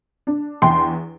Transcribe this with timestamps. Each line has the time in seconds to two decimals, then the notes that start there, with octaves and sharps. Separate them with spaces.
0.27 D4
0.62 E2 G5 C6